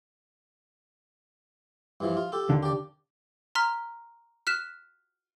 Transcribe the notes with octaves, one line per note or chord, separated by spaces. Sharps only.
G2 E3 F3
F4
G4 A4
D#2 D3
G4 D5
A#5 C6 F6 B6
F6 F#6 B6 E7